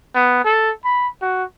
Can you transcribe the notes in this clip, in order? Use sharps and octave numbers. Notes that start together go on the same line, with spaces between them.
B3
A4
B5
F#4